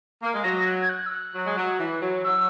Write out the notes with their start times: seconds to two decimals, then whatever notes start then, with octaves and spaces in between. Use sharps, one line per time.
0.22 A#3
0.34 G#3
0.44 F#3 A#6
0.66 F#6
0.82 G#6
0.89 F#6
1.06 E6
1.11 F#6
1.35 F#3
1.45 G#3
1.57 F#3
1.79 E3
2.02 F#3
2.24 F#3 E6